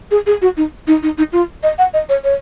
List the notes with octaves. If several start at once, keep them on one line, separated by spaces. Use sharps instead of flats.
G#4
G#4
F#4
D#4
D#4
D#4
D#4
F4
D#5
F#5
D#5
C#5
C#5